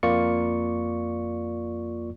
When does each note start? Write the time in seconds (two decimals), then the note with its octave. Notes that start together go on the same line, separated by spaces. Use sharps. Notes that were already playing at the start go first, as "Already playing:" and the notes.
0.03 F2 A#3 F4 D5 C#6 C#7